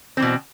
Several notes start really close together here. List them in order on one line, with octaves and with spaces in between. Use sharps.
C4 E3 B2